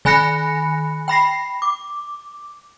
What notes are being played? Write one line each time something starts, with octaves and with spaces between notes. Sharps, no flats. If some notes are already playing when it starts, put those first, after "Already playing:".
D#3 G#5 B5 F#6 A#6 C#7
G5 B5 A#6 C7
D6